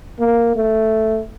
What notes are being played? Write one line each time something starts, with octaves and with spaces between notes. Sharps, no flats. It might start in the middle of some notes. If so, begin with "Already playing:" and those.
A#3
A3